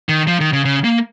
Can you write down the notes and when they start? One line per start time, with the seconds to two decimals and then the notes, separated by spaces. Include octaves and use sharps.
0.09 D#3
0.27 F3
0.40 D#3
0.53 C#3
0.65 C#3
0.84 A#3